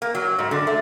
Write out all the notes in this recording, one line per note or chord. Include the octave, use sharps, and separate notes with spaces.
A#3
F#3
G#2
D3
A3